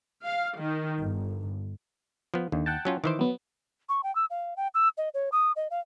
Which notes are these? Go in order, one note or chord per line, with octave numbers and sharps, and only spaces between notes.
F5
D#3
G1
F3 B3
D#2 D3
F#5 G5 A5
F#3 C#4 F4
D#3 E3 C5 D6
F#3 B3
C#6
G5
E6
F5
G5
E6
D#5
C#5
D#6
D#5
F5